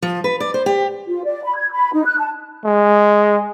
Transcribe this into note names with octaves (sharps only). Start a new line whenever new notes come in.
F3
B4
D5
C5
G4
F4
D5
B5
G#6
B5
D#4
F#6
A5
G#3